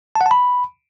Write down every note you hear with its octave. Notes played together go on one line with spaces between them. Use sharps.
A5
F#5
A5
B5